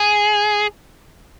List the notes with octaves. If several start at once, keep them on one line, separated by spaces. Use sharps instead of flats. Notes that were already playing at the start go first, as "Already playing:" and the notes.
Already playing: G#4